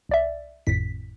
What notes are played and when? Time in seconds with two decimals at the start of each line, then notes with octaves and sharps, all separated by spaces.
0.09 C2 D5 E5
0.67 G#1 F2 A2 B6